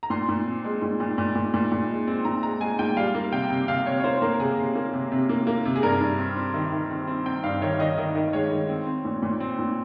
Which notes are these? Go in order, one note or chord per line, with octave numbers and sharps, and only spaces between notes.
A#5
A#2 C6
A#2
C4
G#3
A#2
A#2
A#2
A#2
A#2
A#2
G#3
C4
A#2 A#5
G#3 A#5
G#3 G#5
A#2 G5
G3 F5
A#3
C3 G5
C3
C3 F5
C3 C#5
C#5
A#3 C5
A#3 A#4
A#4
C3 G#4
C3
A#3
C3
C3
A#3
A#3
C3
G#4
G2 A#4
G2
C4
C4
D#3
D#3
C4
C4
C4 G5
G2 F5
D#3 C#5
D#3 D#5
D#3 D#5
D#3
G#3 C#5
D#3
C4
C4
A#2
A#2
C4
A#2